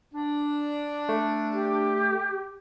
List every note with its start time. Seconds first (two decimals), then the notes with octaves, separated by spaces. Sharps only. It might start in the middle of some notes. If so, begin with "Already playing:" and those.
0.14 D4
1.09 A3
1.52 G4